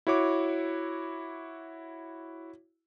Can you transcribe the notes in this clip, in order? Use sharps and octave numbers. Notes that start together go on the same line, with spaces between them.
E4 F#4 C#5 D6